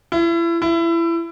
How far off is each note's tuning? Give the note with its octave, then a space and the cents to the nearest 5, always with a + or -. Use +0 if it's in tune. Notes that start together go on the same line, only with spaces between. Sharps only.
E4 +35
E4 +25